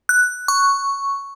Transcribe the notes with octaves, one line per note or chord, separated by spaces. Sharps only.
F#6
C#6